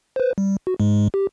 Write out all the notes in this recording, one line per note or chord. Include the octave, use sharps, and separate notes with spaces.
B4 C5
G3
F#4
G#2 G#3
G4